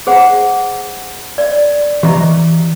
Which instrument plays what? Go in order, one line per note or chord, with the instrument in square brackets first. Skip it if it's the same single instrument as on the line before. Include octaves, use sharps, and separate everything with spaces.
[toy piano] G#4 C5 F#5
D5
[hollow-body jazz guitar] E3 A#5 [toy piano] G4 D#5